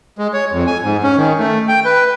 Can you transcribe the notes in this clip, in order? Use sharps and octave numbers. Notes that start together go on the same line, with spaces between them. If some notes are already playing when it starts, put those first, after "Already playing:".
G#3
C#5
F2
G#5
G#2
C#4
D#3
A3
G5
B4